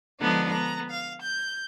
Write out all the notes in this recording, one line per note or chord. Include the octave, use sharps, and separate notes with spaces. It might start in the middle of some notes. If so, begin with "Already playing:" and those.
D3 F3 G#3 B3 D4 D#4
B3 A#5
F5
G6